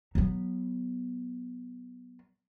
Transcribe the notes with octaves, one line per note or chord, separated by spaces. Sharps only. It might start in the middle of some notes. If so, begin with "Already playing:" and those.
F#3 B3